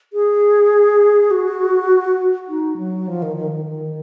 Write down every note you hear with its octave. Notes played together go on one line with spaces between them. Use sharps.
G#4
F#4
D#4
F#3
F3
D#3
D#3
D#3
D#3